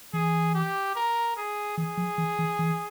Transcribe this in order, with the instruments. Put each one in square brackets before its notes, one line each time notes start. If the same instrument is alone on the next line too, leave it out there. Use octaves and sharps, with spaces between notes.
[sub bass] E3 [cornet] G#4
[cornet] G4
A#4
G#4
[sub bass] E3 [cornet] G#4
[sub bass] F3
E3
E3
E3